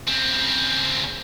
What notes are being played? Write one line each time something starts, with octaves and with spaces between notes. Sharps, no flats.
C#3 C4